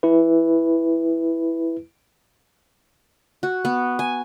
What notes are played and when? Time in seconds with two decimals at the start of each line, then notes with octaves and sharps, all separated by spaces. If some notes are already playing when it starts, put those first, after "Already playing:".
0.03 E4 B4
3.43 F#4
3.65 B3
3.99 G#5